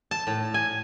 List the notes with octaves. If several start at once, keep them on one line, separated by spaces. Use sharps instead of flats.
A5
A2
G#5